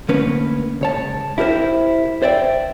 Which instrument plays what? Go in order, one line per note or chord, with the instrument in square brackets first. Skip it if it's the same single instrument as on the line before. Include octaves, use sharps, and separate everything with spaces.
[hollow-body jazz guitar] D3 A3 A#3 C#4 B4
C#2 C#5 A5
E4 G4 A#4 C5
C5 D5 E5 G5